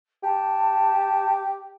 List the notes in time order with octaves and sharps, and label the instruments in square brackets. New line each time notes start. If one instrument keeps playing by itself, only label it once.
[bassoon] G4 [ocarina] A5